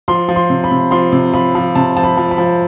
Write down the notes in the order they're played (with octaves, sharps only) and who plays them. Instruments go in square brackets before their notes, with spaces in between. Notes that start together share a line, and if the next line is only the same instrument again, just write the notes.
[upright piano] F3 C6
F3
C6
C3
B5
C3
F3 C6
C3
F3 B5
F3
C3 A5
F3 A5
B5
F3
B5
F3